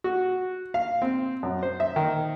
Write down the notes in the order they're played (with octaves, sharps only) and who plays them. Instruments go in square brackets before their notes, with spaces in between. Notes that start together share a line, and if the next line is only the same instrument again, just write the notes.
[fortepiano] F#4
F5
C4
F#2
C5
E5
D#3